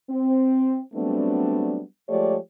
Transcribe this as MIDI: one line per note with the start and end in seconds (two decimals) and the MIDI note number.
0.10 0.80 60
0.95 1.82 54
0.95 1.82 55
0.95 1.82 57
0.95 1.82 59
0.95 1.82 60
0.95 1.82 62
2.09 2.37 53
2.09 2.37 56
2.09 2.37 57
2.09 2.37 67
2.09 2.37 73
2.09 2.37 74